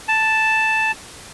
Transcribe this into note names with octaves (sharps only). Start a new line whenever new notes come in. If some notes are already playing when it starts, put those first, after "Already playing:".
A5